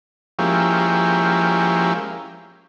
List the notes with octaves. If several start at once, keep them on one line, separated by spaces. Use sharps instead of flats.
F3 G#3 A#3 C#4 E4 G4